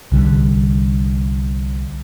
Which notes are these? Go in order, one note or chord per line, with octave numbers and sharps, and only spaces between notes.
C2 D3 G3